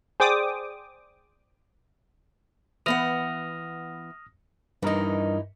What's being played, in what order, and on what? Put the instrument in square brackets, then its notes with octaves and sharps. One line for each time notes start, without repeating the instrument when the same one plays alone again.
[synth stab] G#4 C5 D5 G5 D6 D#6
[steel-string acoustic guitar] E3 B3 F#5 [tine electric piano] D#6 F6 A#6
[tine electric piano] G2 A#4 D#5 [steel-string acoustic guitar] E3 D#4